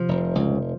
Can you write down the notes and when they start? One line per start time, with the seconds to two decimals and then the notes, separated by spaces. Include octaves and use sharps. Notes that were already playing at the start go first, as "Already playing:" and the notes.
Already playing: C3 F3
0.09 F1
0.35 C#2